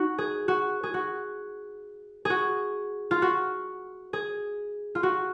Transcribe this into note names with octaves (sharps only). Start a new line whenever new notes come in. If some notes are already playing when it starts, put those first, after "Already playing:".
Already playing: D#4 F#4
G#4
F#4
G#4
F#4
F#4 G#4
F4
F#4
G#4
F4
F#4